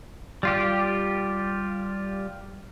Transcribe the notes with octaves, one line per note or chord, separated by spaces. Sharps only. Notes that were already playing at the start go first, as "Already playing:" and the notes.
G3 F4 G4